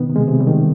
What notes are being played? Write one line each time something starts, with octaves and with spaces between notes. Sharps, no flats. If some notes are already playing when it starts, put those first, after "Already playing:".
Already playing: B2 D#3 B3
C3
G#3
C3
G3
D#3